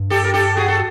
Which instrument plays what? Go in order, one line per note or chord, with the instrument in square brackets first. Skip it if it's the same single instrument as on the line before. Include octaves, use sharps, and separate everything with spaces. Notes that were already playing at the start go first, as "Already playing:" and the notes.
Already playing: [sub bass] G2
[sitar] G4 A4
A#4
G4 A4
F#4 G#4
A4